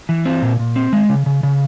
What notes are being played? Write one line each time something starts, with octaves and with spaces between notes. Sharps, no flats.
E3
C4
A#2
A#2
C4
G#3
C#3
C#3
C#3